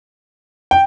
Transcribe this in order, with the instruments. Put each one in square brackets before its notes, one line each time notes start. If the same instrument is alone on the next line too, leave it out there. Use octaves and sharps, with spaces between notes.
[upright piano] G5